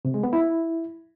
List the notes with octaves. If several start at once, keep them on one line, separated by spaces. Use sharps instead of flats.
C3
G#3
B3
E4